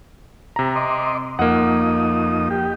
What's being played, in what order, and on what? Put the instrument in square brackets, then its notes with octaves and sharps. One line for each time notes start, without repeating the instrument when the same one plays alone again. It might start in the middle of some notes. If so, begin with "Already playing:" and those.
[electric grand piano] C3 A#5
[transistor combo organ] D#5 C6 D6
[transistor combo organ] F2 D#4 D#6 [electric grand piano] A#3 F#5
[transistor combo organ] G4